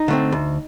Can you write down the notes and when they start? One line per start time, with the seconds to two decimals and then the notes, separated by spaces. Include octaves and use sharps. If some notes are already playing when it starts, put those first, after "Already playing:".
Already playing: D#4
0.08 D3 A3 C4
0.32 D2